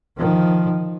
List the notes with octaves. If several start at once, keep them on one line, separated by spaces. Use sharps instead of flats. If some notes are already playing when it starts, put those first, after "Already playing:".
D#3 F3